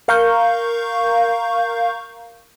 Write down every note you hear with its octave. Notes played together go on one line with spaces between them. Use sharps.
A#4 F5 A#5 C#6 G6